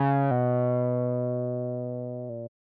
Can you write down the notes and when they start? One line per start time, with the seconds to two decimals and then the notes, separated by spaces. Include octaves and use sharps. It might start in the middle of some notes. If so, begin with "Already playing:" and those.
Already playing: C#3
0.31 B2
2.29 A#2